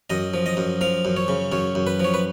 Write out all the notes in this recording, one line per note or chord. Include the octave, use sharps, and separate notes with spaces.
F#2 D#5
F3
D#5
F#2
F3 F5
F#2
C#5
C#3
F#2 C#5
F#2
B4
F3 C#5
B4